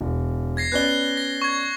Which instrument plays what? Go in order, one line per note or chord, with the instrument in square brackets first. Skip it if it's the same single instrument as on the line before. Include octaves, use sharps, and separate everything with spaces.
[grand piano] E1
[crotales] G#6 A#6 C7
[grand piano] B3 C#4 D5 [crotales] F#6 G7
[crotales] A#6
C#6 G#6